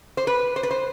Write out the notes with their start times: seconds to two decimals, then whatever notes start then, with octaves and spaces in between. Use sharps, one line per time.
0.17 C5
0.27 B4
0.56 C5
0.63 B4
0.71 C5